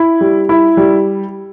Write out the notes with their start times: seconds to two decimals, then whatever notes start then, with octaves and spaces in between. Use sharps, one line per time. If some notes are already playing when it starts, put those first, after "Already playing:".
Already playing: E4
0.21 G3
0.49 E4
0.77 G3